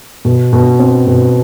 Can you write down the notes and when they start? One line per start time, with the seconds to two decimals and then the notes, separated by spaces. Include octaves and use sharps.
0.25 B2
0.53 B2
0.79 C4
1.07 B2